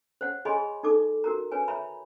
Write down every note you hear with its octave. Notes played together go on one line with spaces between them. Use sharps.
C5 C#5 F#5
G#4 C#5 D#5 G#5 B5 C6
D#4 A4 D6
F#4 A#4 A#5
B4 C#5 G#5
C#5 E5 A#5 B5